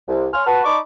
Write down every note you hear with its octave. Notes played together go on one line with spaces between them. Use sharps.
C2
C#5 G#5 C6 F6
F#4 B4 A5
D#4 D5 A5 B5 C#6 D6